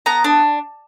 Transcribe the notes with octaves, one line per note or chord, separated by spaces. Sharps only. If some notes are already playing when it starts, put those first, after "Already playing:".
B3 A#5
D4